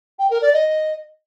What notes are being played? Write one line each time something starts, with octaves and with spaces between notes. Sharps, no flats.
G5
A#4
D5
D#5